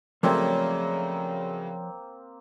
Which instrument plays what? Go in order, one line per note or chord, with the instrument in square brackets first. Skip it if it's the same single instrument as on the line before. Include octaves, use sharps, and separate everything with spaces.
[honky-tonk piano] C#3 F#3 A3 [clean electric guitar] F3 C#5 D5 [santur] A#3 C4